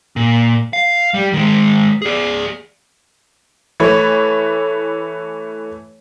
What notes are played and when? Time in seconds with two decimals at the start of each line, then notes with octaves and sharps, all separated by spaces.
0.16 A#2
0.73 F5
1.14 G3
1.33 D#3 G#3
2.02 G#4 D5
3.80 E3 A3 B4 C#5